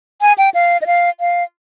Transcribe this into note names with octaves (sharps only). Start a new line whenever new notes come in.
G#5
G5
F5
D#5
F5
F5